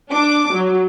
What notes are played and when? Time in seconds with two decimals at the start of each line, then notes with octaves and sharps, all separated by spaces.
0.12 D4 D6
0.54 F#3